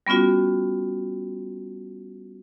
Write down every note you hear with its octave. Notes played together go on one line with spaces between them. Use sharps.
G3 B3 C#4 F4 F#4